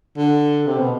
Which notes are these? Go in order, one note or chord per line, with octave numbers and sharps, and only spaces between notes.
D3
C3
B2